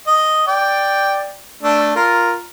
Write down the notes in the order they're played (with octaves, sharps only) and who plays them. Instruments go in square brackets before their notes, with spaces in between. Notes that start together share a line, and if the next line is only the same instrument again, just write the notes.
[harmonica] D#5
D5 G5
A3 D4 A4
F4 A#4